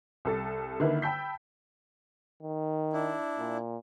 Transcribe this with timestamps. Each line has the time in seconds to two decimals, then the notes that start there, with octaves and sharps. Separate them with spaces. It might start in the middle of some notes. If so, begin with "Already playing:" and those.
0.25 C2 A4 A6
0.80 D3 D#3 A#3 E4 B4
1.02 G5 A5 B5 E6 G6 B6
2.43 D#3
2.93 D4 E4
3.38 A#2